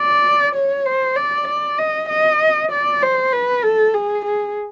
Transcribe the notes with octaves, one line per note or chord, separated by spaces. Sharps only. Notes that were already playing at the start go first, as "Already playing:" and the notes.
Already playing: D5
C#5
C5
D5
D5
D#5
D#5
D5
C5
B4
A4
G#4
G#4